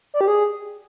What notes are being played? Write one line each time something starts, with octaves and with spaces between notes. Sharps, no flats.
D5
G4
G#4